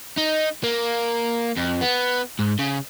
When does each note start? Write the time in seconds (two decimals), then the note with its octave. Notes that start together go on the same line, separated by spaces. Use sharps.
0.17 D#4
0.64 A#3
1.57 F2
1.81 B3
2.39 G#2
2.59 C#3